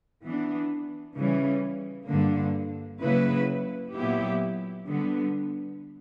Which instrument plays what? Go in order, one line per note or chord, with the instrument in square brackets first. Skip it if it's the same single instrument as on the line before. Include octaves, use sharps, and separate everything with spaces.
[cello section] E3 B3 D4
C#3 E3 G3 C#4
G2 D3 A#3 D4
C#3 F#3 A#3 E4 B4
A#2 F#3 B3 E4 G4
D3 G3 B3